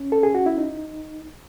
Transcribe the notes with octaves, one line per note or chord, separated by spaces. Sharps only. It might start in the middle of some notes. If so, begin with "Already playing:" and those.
Already playing: C#4
A4
G#4
F#4
E4
D#4